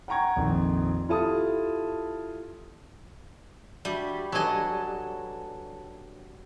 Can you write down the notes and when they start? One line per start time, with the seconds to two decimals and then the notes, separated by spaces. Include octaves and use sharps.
0.08 F#5 G5 A#5 C#6 G#6
0.36 A#1 F2 D#3
1.09 E4 F4 G4 A4 A5 D#6
3.85 G3 D4 F#4 E5
4.32 F#3 D4 A4 B4 C#5 D#5 G#5